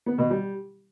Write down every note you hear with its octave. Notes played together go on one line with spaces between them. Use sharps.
B3
B2
G3